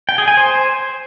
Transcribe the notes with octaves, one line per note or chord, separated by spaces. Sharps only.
G5
G#4
G#5
C5